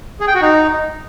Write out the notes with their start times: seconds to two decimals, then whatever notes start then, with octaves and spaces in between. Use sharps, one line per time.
0.21 G#4
0.28 G5
0.35 F#4
0.42 D#4